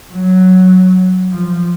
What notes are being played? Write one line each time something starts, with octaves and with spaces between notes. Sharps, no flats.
F#3
F3